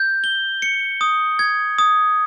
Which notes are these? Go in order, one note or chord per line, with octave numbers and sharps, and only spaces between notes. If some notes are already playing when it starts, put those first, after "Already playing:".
Already playing: G6
G7
C#7
D#6
G#6
D#6